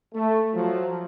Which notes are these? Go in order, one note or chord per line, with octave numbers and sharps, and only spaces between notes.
A3
F3 F#3